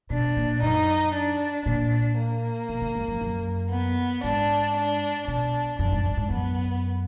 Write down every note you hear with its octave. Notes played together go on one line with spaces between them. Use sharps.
B2 D4
A#2
F#2 D#4
D4
A#2 D4
A#3
B2
D3
G#2
F#2
F#2
B3
G#2 D4
D4
B2 D4
F#2 D4
G#2
G#2
G#2
F#2 B3